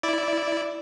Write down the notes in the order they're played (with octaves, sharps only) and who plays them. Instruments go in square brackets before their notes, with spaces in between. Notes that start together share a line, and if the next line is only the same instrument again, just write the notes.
[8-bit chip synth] E4 D5